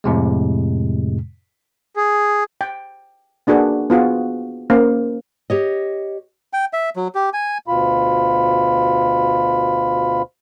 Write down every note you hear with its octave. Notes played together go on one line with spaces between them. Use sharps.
F2 A2 C3 G#3
G#4
G5
A#3 D4 F#4 G#4 B4
B3 F4 F#4 G#4
A#3 C#4 C5 F5
G4 C#5 D#5
G5
E5
F#3
G4
G#5
D2 B2 F4 B5